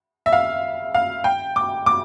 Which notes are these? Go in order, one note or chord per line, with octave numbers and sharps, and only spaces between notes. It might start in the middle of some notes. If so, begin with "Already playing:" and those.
E5
F5
F5
G5
D6
D6